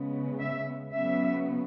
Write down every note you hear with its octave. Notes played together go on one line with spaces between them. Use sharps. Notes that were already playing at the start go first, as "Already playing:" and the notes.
Already playing: C#3 G#3 B3
E5
C#3 F#3 B3 E5